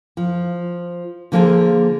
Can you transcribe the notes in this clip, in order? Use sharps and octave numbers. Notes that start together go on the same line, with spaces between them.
F3
D3 F3 A#3 B3 G#4 A4